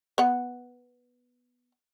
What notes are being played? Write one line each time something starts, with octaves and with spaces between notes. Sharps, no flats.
B3 F#5